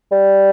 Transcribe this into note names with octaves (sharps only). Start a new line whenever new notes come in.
G3